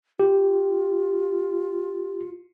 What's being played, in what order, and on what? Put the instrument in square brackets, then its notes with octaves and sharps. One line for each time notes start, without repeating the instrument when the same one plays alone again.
[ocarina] F4 [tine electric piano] G4